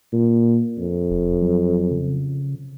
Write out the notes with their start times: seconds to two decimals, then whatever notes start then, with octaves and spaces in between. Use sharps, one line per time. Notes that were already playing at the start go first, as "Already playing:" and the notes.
0.13 A#2
0.78 F2
1.10 E1
1.42 F#3
1.91 C#3